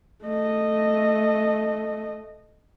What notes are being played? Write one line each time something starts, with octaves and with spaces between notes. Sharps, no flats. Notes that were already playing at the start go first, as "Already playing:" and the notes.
A3 D#5